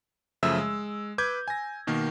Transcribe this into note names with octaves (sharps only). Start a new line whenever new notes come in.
F#2 C#3 F3 A3 E5 E6
G#3
B4 D6 G6 G#6
G#5 A#6
B2 D#3 A#3